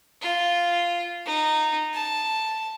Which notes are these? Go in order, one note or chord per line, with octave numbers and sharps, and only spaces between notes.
F4
D#4
A5